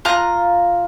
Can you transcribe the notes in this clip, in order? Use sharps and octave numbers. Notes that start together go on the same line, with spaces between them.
F4 A#5 F#6